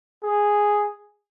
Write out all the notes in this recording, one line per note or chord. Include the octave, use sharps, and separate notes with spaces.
G#4